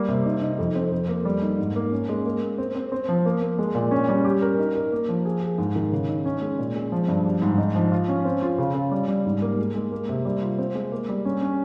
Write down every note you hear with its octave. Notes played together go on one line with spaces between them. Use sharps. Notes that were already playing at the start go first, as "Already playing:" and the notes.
Already playing: G3 A#3
C3
D#4
D#4
F2
C4
F2
A#3
G3
D#4
G#2
A#3
C#4
G#3
A#3
A#3
C4
C4
C4
F3
A#3
A#3
G#3
A#2
C#4
G3
G4
A#4
D#4
A#4
A#3
F3
G#4
G#4
G#2
D#3
C#3
D#4
C#4
G#3
A#2
G#3
F3
G2
G3
G#2
D#4
F3
F4
C#4
C4
F4
C#3
C#3
G3
G3
G#2
A#3
G#3
G#3
A#3
C3
G3
F4
C4
G#3
A#3
G3
C#4
C#4